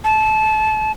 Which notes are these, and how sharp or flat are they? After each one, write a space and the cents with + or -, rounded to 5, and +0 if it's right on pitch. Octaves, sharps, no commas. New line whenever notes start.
A5 -25